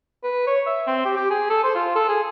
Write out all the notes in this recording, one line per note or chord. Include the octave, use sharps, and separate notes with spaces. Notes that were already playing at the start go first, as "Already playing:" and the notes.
B4
C#5
E5
C4
G4
G4
G#4
A4
C5
F4
A4
G#4